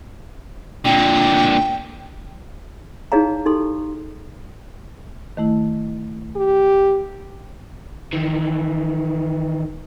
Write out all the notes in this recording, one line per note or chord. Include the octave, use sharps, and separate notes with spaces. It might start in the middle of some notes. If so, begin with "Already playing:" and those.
A#2 D3 G5
D#4 E4 G#4 C#5 F5 A#5
D#4 G4 A4 C6
D#3 A3 E4
G4
D#3 E3